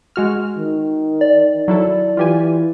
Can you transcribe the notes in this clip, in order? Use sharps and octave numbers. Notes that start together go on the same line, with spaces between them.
G#3 F#4 F6
D#3
D5
F#3 E4 A4
E3 F4 G4 G#5